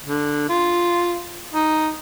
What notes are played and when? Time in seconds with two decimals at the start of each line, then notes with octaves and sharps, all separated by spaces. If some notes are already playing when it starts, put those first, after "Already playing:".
0.06 D3
0.49 F4
1.54 D#4